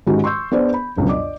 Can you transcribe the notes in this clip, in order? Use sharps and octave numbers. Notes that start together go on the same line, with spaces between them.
G#2 D#3 G#3 C#4 F#4 G4
C6 C#6 E6 G6
B3 D4 G#4 C5 D5
B5
G1 C#2 F#2 B2
D5 D#5 D6